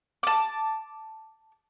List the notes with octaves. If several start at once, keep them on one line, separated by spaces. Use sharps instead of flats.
A5 D6